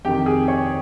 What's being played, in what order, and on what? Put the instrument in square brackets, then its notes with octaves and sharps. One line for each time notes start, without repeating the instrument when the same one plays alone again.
[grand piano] F2 C3 D#3 G4 G5
G#4 G#5
C#5